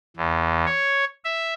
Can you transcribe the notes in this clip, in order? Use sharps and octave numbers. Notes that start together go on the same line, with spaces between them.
E2
C#5
E5